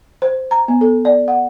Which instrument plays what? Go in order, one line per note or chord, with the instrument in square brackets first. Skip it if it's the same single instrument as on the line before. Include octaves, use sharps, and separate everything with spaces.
[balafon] C5
A#5
B3
A4
D5
F#5